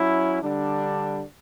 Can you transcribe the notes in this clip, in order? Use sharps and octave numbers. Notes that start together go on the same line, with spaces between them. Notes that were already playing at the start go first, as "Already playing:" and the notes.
Already playing: F#3 C#4 E4
D3 G3 D4